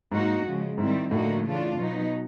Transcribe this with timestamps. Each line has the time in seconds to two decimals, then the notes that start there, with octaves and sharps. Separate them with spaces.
0.12 G#2 F#3 A#3 D#4 F#4
0.45 C#3 F3 G#3
0.78 G#2 D#3 G3 C4 E4
1.11 A2 D3 F3 A#3 D#4 F#4
1.44 C#3 E3 A3 D4 F4
1.78 B2 F#3 B3 D#4